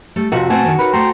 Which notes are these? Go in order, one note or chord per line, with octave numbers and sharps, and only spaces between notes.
G3 A3
F2 C3 F#4 F#5
B2 A3 C4 F#4 G#5 A5
D3 D#3 B3
D#4 A#4 B4 C#5
A3 C5 G5 A#5 C6